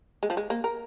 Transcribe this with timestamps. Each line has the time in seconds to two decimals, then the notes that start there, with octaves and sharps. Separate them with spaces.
0.23 G#3
0.30 F3
0.37 G#3
0.50 A#3
0.64 A#4